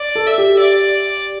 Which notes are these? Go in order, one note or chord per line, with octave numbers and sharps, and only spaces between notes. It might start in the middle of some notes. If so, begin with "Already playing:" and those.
Already playing: D5
A4
E5
G4
D5